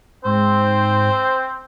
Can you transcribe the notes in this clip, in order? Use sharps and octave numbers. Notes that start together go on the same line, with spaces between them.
G#2 C4 C5